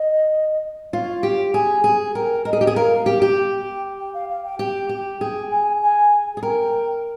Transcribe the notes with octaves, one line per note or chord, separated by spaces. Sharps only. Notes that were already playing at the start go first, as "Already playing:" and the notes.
Already playing: D#5
F4 C#5
G4
G#4 G#5
G#4
A#4 G5
A#4 D#5
G#4
G4
G#4
A#4 F5
G4
G4
G5
G5
F5
F5
G5
G4 G5
G4
G#4 G5
G#5
G#5
G#4
A#4 G5